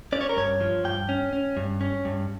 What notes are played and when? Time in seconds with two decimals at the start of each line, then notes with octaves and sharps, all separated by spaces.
0.12 C#4 D5
0.21 C#5
0.29 A#4
0.37 G2 C#5
0.61 F3
0.84 G2 G5
1.09 C#4
1.33 C#4
1.57 G2
1.81 C#4
2.05 G2